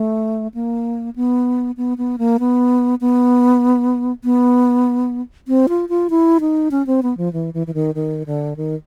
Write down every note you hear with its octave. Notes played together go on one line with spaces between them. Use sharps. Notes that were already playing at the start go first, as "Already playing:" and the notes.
Already playing: A3
A#3
B3
B3
B3
A#3
B3
B3
B3
C4
F4
F4
E4
D#4
C#4
C4
B3
F3
E3
E3
E3
D#3
D#3
D3
D#3